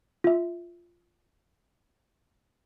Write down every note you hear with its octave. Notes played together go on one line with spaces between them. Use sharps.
F4 E5